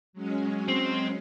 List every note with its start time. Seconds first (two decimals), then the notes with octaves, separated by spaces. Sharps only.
0.13 F#3 G#3 C#4
0.68 C4